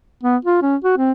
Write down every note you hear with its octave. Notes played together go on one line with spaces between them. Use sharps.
B3
F4
C#4
F#4
C4